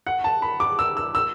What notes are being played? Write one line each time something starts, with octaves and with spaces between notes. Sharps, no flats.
F#5
A5
B5
D6
E6
E6
E6